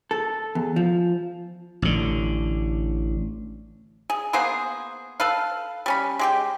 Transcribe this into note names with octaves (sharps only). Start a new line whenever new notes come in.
A4
E2
F3
A1 D3
G#4
A#3 B3 G#4 C5
A4 B4 F5
G3 C#4 B5
G#3 G4 G5